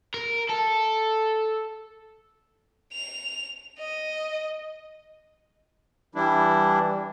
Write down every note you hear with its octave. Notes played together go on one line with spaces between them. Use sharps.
A#4
A4
F7
D#5
E3 G3 D4 E4